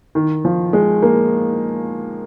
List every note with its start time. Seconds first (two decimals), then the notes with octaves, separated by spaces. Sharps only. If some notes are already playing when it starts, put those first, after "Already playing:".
0.15 D#3
0.45 F3
0.73 G#3
1.02 A#3